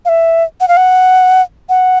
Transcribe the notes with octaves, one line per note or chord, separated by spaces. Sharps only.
F5
E5
F#5
F5
F#5
F#5